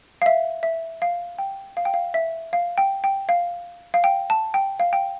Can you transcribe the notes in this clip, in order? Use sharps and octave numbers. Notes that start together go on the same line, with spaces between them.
F5
E5
E5
F5
G5
F5
G5
F5
E5
F5
G5
G5
F5
F5
G5
A5
G5
F5
G5